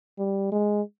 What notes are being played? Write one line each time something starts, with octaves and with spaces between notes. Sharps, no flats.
G3
G#3